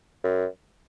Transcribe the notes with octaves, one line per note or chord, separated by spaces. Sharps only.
F#2